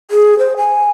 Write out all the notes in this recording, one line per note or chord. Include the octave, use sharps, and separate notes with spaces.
G#4
C5
G#5